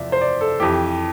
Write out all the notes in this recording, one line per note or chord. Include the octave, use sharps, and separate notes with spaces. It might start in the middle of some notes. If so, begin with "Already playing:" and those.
Already playing: E2 C3 F3 D5 E5
C5
D5
A4
F2 E3 G4